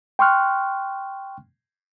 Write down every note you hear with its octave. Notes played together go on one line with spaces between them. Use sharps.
G5 C6 C#6 F6 F#6